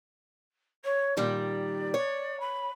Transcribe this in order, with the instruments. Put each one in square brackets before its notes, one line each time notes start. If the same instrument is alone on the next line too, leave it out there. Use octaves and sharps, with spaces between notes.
[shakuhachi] C#5
[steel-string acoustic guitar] A#2 D#3 G3 [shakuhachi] D5
[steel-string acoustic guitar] C#5
[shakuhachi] B5